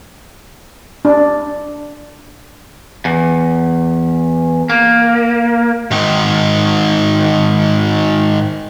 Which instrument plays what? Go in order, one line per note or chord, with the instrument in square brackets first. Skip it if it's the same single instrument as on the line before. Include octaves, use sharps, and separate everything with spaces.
[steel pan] D4
[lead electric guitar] E2
A#3
[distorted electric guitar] G#2 D#3